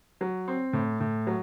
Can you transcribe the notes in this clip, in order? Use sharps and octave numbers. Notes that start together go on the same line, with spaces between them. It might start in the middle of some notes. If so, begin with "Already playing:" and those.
F#3
C4
A2
A2
F#3